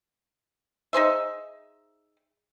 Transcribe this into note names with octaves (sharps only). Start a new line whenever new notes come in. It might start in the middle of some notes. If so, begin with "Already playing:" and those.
D#4 G#4 C5 E5